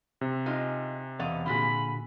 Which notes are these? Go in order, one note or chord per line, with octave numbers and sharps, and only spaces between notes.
C3
G#3 D#4 F4
E2 B2 B3 D5 F5
A#2 D3 F4 F#4 G#4 B5